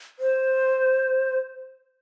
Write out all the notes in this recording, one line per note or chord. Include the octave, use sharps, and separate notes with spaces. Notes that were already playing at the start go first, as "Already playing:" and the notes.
C5